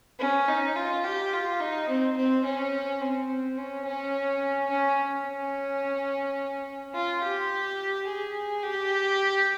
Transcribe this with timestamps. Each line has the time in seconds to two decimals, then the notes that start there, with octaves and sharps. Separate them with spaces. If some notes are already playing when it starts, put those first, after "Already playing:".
0.20 C#4
0.48 D#4
0.76 F4
1.04 G4
1.33 F4
1.60 D#4
1.88 C4
2.16 C4
2.44 C#4
3.01 C4
3.57 C#4
3.85 C#4
4.70 C#4
5.26 C#4
6.94 F4
7.22 G4
8.07 G#4
8.63 G4